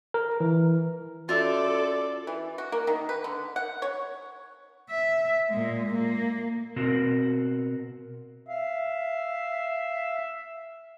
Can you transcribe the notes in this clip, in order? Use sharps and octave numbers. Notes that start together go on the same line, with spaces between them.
A#4
E3
C#4 F4 F#4 A4 D5 E5
E3
F#4
A#3
D#3
B4
D3
F#5
C#5
E5
A#2 G#3
A#3
B2 C4 F#4 A#4
E5 F5